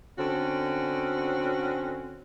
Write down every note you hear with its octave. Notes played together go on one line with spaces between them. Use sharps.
D3 C4 C#4 F#4